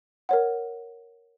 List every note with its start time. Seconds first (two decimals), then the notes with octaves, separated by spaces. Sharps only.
0.29 A#4 C#5 F#5